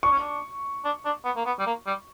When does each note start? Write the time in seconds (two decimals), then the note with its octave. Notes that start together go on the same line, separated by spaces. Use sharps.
0.03 D4 C#6
0.11 C#4
0.19 D4
0.85 D4
1.05 D4
1.25 B3
1.36 A#3
1.46 B3
1.59 G3
1.66 A#3
1.86 G3